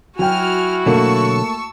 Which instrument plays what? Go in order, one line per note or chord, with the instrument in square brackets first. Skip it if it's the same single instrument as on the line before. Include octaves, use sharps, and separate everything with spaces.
[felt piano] F#3 G5 [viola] E4 F#4 [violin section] G#5 F6
[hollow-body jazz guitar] B2 D3 F#3 [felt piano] A3 A#3 [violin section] A5 C#6 E6